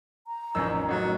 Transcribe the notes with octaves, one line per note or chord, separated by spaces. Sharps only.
A#5
A1 F2 D#3 C#4 E6
A1 F#3 A3